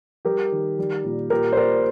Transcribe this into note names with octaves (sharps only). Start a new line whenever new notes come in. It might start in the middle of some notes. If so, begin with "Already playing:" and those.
G3 G4 A#4
D#3
G3
A#2
A#2 G4 A#4
C5
A#2 A#4 D5